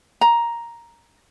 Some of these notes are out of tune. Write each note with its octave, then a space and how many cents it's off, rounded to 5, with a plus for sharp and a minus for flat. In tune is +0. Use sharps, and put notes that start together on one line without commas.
A#5 +5